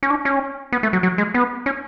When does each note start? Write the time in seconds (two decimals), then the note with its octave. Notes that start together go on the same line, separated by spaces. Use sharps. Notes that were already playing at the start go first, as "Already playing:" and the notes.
0.03 C#4
0.10 D4
0.25 C#4
0.72 B3
0.83 A3
0.93 F#3
1.03 F#3
1.18 G#3
1.34 B3
1.66 C#4